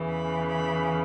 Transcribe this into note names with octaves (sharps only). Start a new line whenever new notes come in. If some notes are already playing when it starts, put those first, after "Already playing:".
Already playing: E2 C#3 E3
B5
B5